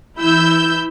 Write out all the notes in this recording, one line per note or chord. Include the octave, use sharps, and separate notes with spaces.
E3 E4 E6 G6